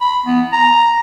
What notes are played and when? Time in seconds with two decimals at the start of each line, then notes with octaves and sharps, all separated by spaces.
0.01 B5
0.26 B3
0.53 A#5